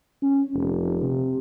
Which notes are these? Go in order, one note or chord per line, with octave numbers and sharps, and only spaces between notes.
C#4
F1
C3